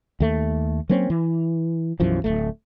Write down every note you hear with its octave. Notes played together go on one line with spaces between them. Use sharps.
D#2 A3
F#3 A#3 C4 C#4
E3
B1 F#2 E3 F3
D1 G1 A3